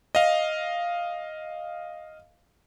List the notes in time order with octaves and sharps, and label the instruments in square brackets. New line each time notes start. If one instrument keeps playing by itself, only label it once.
[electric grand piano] D#5 F5